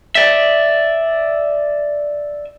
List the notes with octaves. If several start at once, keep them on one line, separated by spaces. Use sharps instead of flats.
D5 E5